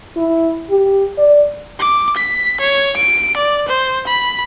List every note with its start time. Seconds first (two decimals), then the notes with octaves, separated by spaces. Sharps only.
0.17 E4
0.70 G4
1.18 D5
1.79 D6
2.16 B6
2.60 C#5
2.96 D7
3.37 D5
3.68 C5
4.07 B5